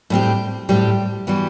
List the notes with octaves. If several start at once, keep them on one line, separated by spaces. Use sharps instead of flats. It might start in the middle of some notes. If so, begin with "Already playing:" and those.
A2 G3 C4 G4
A2 G3 C4 G4
E3 G3 B3 F#4